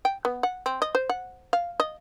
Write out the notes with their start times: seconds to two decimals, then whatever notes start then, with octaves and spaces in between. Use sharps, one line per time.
0.05 G5
0.25 B3
0.43 F#5
0.66 C4
0.82 D#5
0.95 C5
1.09 F#5
1.53 F5
1.80 D#5